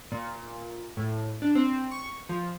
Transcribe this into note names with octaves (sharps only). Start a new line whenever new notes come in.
A#2
A2
D4
C4
C#6
F3